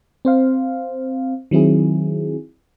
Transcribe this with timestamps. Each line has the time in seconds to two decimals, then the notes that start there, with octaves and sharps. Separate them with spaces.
0.25 C4 C5 F5
1.51 D#3 F#3 C4 E4 G#4